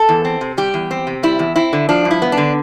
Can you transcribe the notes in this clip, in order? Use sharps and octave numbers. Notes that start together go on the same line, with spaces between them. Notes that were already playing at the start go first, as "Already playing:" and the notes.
Already playing: A4
E2
C4
C3
G3 G4
E2
C4
C3
G3 E4
E2
C4 E4
D3
F3 D4
G2
E4
B3
D4
D3